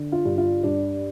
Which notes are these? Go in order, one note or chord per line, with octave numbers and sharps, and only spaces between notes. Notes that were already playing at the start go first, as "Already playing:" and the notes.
Already playing: D3
F4
G2
F4
G2 D4